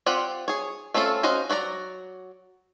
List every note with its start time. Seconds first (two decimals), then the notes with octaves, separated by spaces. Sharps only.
0.06 C4 F4 G4 D5 F#5
0.48 G#4 C#5
0.94 A3 C4 C#4 F4 A4
1.23 C#4 F#4 C5 D#5 F5
1.50 F#3 F#4 D5 A#5